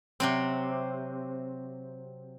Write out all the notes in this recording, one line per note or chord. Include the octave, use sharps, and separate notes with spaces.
C3 F#3 C4